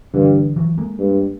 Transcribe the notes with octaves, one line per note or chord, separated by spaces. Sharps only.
G2 D3 E3
E3 F#3
G#3 A#3
G2